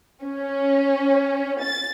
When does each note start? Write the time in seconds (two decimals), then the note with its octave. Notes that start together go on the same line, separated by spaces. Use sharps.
0.24 C#4
1.63 A6